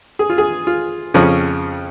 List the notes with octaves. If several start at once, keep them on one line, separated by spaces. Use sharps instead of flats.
G#4
F4
G#4
F4
F2 C#3 F3 C#4